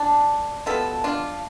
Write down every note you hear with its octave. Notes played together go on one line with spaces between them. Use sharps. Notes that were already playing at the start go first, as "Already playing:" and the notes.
Already playing: D4
B2 G3 B3 F4 A4
D4 F4